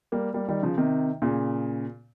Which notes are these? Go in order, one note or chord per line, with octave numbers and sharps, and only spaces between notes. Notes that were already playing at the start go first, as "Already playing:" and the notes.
G3 A#3
G3 A#3
D#3 G3
C#3 F3
C3 D#3
A#2 C#3